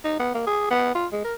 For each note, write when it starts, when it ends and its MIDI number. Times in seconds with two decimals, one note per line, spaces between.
0.04 0.19 63
0.19 0.30 59
0.35 0.44 58
0.46 0.70 68
0.70 0.93 59
0.95 1.07 65
1.12 1.21 56
1.24 1.34 70